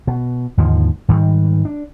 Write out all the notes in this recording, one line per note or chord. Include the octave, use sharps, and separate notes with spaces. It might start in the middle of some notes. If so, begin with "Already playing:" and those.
B2
D#2 G#2 D3 F3
G#2 D#3 G3 G#3
D4